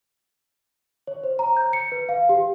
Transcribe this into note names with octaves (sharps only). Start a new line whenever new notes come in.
C#5
C5
A#5
G6
C#7
B4
F5
G4